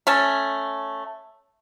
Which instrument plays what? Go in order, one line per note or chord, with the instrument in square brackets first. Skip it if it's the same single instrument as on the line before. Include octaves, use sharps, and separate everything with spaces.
[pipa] A3 C#4 A5